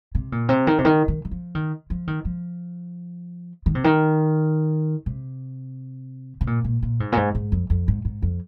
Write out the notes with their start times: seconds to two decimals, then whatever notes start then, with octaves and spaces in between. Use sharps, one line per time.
0.15 C3
0.32 A#2
0.49 C3
0.67 D#3
0.78 C3
0.85 D#3
1.08 D#3
1.25 D#3
1.31 F3
1.55 D#3
1.90 F3
2.07 D#3
2.25 F3
3.66 D#3
3.75 C3
3.84 D#3
5.06 C3
6.41 C3
6.47 A#2
6.64 A#2
6.82 A#2
7.00 G#2
7.12 A#2
7.17 G#2
7.35 G#2
7.52 F2
7.70 F2
7.88 G#2
8.05 G#2
8.22 F2